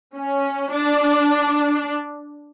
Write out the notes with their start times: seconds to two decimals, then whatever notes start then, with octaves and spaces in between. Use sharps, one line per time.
0.15 C#4
0.71 D4